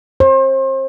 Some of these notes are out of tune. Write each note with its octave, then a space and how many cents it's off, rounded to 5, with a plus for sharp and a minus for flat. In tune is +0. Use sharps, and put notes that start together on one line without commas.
C5 +35